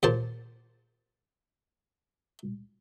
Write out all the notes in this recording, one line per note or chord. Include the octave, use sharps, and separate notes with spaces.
D#2 A#2 C5 A5